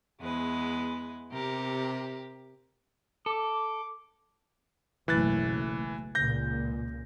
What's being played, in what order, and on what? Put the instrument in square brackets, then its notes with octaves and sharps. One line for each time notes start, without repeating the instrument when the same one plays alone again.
[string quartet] E2 G#3 B4
C3 G4 A#4
[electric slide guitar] A4 [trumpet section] D6
[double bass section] F#1 B1 A3 [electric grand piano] E3 F#6 A6
[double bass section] C#2 A#2 [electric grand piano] G6 A#6